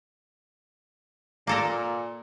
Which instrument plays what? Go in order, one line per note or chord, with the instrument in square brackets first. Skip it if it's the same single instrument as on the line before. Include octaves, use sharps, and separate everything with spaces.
[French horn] A#2 [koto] A#3 A4 A#4